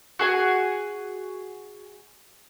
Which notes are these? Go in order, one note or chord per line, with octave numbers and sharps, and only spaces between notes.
F#4 G#4 G#5